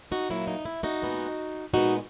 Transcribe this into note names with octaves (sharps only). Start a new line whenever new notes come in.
D#4 F#4
A#2 F#3 A#3 E4
D#4
E4
D#4 F#4
A#2 G#3 B3
A#2 G#3 B3 D#4 F#4